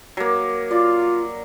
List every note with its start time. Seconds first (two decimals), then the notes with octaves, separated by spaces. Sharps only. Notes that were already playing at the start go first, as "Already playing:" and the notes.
0.17 F#3 A#3
0.71 F4 D5